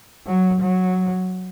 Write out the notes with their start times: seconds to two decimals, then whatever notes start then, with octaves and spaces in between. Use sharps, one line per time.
0.26 F#3
0.61 F#3